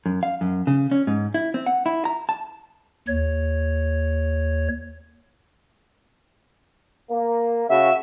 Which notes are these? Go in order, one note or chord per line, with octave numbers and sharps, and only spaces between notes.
F#2
F5
F#2
C#3
C#4
G#2
E4
C4
F#5
E4
A#5
A5
D#2 C#5
A#3
C#3 F#4 E5